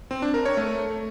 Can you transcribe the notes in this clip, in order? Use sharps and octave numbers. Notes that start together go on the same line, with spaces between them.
C4
D4
A#4
C#5
A3